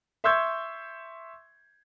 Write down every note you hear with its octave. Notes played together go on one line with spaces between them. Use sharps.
E5 C6 C#6 E6 G6 G#6